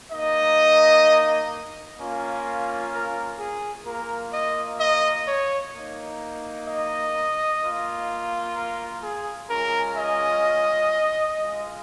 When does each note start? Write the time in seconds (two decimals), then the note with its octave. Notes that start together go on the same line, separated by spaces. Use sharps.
0.11 A#3 D#4 D#5
1.99 A#3 C#4 F4
2.93 A#4
3.39 G#4
3.86 A#3 F4 A#4
4.33 D#5
4.80 D#5
5.27 C#5
5.74 A#3 D#4
6.68 D#5
7.62 A#3 F4
8.56 A#4
9.03 G#4
9.50 G#3 C#4 F4 A#4
9.97 D#5
11.38 G#3 F4